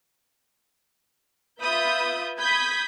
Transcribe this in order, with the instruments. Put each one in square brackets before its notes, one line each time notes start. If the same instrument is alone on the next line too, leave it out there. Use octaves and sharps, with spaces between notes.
[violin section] F4 B4 E5 B5 D#6 G6
B5 D#6 G6 G#6 B6